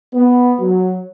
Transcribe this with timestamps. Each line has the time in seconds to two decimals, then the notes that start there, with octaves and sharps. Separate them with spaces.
0.14 B3
0.61 F#3